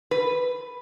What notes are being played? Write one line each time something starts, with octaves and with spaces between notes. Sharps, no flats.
B4